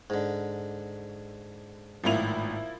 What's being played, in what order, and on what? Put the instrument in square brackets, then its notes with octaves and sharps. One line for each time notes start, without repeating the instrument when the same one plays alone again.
[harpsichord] G#2 D3
[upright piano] G#1 A2 F7 [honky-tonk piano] F3 A#3 E4